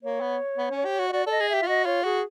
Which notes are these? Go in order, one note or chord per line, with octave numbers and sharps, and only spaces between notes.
A#3 C#5
B3
B3
C#4
G4
F#4
D#5
F#4 D5
A4 D5 D#5
G#4
G4 E5
F4
F#4 D#5
F4 C#5
F#4 G#4